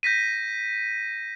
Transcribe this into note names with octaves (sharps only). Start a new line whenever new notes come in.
G6 A#6 B6 D#7